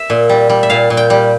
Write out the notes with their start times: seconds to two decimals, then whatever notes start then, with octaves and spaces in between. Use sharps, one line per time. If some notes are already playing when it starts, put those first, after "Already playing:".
Already playing: E5
0.10 A#2
0.29 G3
0.49 G3
0.63 E5
0.70 A#2 F5
0.90 A#2
0.97 G5
1.10 G3